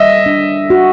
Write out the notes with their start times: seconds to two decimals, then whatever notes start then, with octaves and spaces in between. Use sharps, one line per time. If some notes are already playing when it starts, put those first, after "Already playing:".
Already playing: G3 D#5 E5
0.26 D4
0.70 F#4